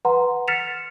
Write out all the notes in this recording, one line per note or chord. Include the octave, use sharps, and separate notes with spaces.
B4 F#5 A#5 C6
F6 A6 B6 C#7 E7 F7